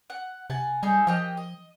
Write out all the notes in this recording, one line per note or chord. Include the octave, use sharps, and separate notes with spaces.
F#5
C3 F#5 G#5 A5
G3 D#4 G#4 A4
F3 A#3 G4 D#5
D#5